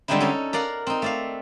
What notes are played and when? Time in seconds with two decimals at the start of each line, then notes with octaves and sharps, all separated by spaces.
0.08 D3 G3 G#3 C4 D#4 E4
0.20 C#4 D#4 A4
0.53 A#4 D5 F5 F#5
0.87 C4 D#4
1.02 A3 D5 F5